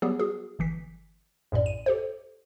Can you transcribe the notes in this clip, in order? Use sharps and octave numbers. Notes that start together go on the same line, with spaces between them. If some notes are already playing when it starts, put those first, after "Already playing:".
F#3 G3 B3 G4 G#4
F#4 G#4
G1 E3 B6
A#1 F#2 A2 D5
D#7
G4 A4 C5